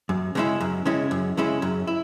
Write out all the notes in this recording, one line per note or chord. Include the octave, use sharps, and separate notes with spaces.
F#2
C#3 G#3 C#4 E4
F#2
C#3 G#3 C#4 E4
F#2
C#3 G#3 C#4 E4
F#2
E4